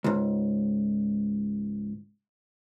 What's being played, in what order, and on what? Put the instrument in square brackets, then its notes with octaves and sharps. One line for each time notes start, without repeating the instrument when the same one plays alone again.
[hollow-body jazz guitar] C#2 G#2